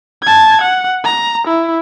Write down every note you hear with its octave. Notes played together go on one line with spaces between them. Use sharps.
A5 G#6
F#5
A#5
E4